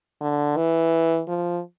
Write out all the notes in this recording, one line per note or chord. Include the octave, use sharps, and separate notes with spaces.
D3
E3
F3